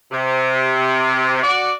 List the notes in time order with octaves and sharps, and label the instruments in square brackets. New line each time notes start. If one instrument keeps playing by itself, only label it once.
[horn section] C3
F#4 D5